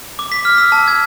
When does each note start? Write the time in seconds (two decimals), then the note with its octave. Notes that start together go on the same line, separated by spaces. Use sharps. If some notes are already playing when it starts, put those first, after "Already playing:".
0.19 D6
0.32 B6
0.45 F6
0.58 E6
0.72 A5
0.88 G#6